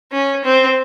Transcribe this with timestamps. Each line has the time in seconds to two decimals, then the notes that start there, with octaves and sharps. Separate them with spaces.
0.12 C#4
0.44 C4